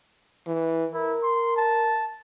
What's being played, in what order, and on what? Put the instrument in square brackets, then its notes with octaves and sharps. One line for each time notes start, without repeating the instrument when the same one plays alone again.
[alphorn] E3
[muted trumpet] E4 [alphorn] A#4
[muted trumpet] C6
A5